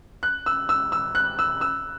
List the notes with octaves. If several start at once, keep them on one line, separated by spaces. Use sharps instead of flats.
F#6
E6
E6
E6
F#6
E6
E6